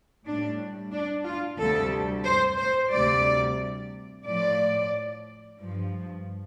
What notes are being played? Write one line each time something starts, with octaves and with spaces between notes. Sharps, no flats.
A2 G3 D4
D4
F4
D2 C3 G3 A4
C5
C5
D2 C3 G3 D5
A2 F3 D5
G2 F3